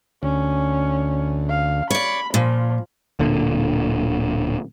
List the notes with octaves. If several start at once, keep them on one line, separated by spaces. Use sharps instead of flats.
D2 C#4
F5
C#5 D5 B5
A#2 F3
D1 A#2 D3